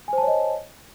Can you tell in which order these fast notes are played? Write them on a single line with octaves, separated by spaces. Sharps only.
G#5 C5 A5 C#5 D#5